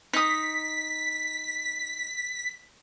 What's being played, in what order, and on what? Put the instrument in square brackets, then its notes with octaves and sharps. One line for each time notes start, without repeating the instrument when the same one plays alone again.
[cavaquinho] D#4 D#6 [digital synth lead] B6